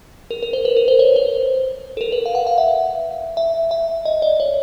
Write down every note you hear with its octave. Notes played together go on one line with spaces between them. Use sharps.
A#4
A#4
C5
B4
A#4
C5
C#5
C5
A4
A#4
B4
F5
F#5
F5
E5
E5
E5
D#5
D5
C#5